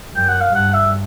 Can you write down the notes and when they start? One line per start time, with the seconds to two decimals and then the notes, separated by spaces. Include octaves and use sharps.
0.15 F#2 G5
0.29 F#5
0.41 F5
0.55 G2 F#5
0.74 E5